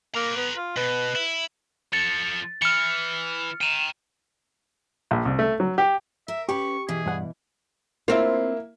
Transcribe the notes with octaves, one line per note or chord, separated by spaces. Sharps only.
A#3 B4 A#5
B3
F4
B2 B4
E4
F3 A4 A6 C#7
E3 F6 C#7
G5 A#5 D#7 E7
A#1
C2
A3
F#3
G4
A#4 E5
C#4 G4 B4 C#6
B2 E3 G#4
G2 F#5
A#3 C4 E4 F4